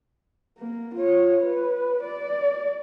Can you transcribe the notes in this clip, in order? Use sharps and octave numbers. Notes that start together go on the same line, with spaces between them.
A#3
F4 C#5
B4
D5